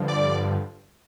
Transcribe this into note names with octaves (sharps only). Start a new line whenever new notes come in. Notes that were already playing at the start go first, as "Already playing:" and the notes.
Already playing: G2 D3 F3
D5 D6